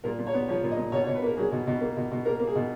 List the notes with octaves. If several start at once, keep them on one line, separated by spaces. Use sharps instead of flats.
A#2 A#4
A#2
C#5
B3
F3 C#5
A#2
D#5
A#2
B2 C#5
C#5
B2
B4
A#3 A#4
F#3 G#4
B2
B2
A#3
B2
B2
A#3 A#4
A#3
G#4
B2